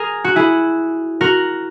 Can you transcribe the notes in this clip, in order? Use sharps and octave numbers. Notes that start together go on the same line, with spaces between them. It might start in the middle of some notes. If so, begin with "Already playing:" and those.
Already playing: G#4 A#4
F#4
E4 G#4
F#4 A#4